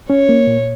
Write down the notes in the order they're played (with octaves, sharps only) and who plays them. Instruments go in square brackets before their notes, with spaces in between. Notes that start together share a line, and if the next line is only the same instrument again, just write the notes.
[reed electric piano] C#4 [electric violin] C#5
[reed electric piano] A#3
A#2